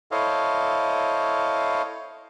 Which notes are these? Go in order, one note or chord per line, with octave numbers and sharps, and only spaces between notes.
E4 A4 C5 C#5 D#5 F5